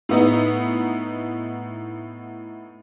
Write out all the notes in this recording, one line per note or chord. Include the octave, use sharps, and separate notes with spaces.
A2 B3 D#4